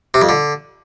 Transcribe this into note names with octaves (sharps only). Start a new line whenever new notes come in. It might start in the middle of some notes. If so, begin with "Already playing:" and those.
C3
F2
D3